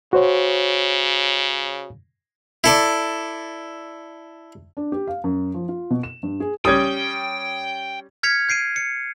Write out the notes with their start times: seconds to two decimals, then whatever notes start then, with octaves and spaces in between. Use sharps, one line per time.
0.13 C#3 F#4 C5 C#5
2.64 E4 A4 D5
4.77 D4
4.92 G4
5.07 F5
5.24 F#2
5.54 F3
5.69 F4
5.90 B2
6.03 E7
6.23 G2
6.40 G#4
6.65 G3 C#4 G5 D#6 G#6
8.23 F6 G#6 B6 C#7 F7
8.49 G6 C7 D7 D#7
8.76 C#7